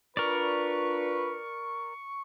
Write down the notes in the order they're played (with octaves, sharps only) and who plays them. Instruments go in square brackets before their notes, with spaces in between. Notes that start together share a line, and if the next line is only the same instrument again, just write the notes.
[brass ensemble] D4 F4 B4 [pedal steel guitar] A#4 D5 [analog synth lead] C#6